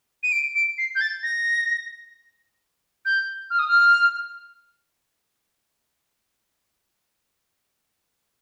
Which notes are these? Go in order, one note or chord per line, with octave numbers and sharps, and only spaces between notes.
D#7
D7
D7
C7
G6
A6
A#6
G6
F6
D#6
F6